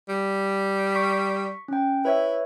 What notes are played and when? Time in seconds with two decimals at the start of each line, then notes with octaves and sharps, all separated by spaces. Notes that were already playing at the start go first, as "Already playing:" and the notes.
0.09 G3
0.92 C#6 B6
1.68 C#4 G5
2.05 E4 B4 C#5 E5